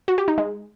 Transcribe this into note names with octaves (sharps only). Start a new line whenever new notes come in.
F#4
G4
D#4
G#3